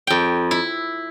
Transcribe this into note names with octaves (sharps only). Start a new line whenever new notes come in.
F2 G5
E4